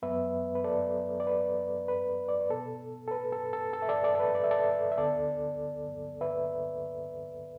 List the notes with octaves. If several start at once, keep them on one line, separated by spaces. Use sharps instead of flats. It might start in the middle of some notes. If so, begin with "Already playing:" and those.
F#2 F#3 B3 B4 E5
B4
A4 D5
D5
B4
B4
D5
B4
B2 B3 A4
A4
B4
A4
A4
A4
E5
A4 D5
A4 D5
A4
B4
D5
E5
A4 D5
E5
D2 D3 B3 A4 D5
B4 E5